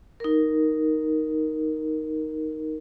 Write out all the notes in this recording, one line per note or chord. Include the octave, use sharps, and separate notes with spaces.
D#4 A#4